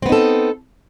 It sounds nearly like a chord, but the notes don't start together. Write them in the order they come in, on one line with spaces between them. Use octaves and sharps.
C4 B3 D#4 A4